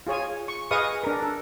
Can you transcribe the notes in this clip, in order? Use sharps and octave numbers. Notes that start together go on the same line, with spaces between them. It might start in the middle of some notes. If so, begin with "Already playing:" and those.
F4 G#4 C#5 G#5
C#6
G#4 B4 D#5 F5 C#6 D#6
D4 A#4
A4